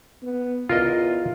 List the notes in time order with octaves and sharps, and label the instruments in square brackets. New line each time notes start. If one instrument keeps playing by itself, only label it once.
[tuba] B3
[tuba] E2 [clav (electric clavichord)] F4 A#4 D#5